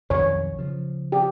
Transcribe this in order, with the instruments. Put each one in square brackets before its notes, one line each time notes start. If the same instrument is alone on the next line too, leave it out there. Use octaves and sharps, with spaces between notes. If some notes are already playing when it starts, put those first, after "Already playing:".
[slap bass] B1 F2 D#3 [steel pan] C#5
[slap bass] C#3 F3
[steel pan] G4